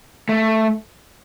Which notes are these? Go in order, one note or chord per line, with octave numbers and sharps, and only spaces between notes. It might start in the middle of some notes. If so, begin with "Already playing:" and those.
A3